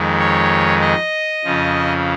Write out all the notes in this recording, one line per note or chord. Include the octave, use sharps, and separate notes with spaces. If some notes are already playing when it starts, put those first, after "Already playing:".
Already playing: F2 D#3 G#3
C#5
D#5
F2 C#3 F3